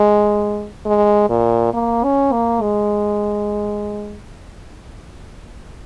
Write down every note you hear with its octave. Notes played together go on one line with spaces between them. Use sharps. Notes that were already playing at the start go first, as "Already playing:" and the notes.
Already playing: G#3
G#3
A#2
A#3
C#4
A#3
G#3